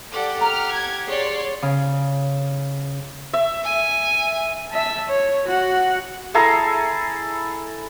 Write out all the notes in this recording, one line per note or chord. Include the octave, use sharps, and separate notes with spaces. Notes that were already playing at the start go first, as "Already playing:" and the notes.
G4 A4 D5 F#5
A4 G5 A#5 F6
G#6
G#4 C#5 D5 C6
C#3
E5
G#5
E5 A5
C#5
F#4 F#5
E4 G#4 A4 A#5